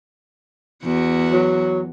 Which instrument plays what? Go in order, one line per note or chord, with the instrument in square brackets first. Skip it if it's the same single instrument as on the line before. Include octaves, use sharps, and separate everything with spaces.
[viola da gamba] E2 F#4
[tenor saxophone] F#3